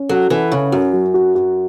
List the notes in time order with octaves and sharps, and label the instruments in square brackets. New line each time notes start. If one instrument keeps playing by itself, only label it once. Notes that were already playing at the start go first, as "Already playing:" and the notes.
Already playing: [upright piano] C#4
[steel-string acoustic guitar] F#3 [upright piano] A4
[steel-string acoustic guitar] E3 [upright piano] A4
[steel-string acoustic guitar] C#3 [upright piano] C#4
[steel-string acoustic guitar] F#2 [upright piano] F#4
[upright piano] F#3
F#4
F#4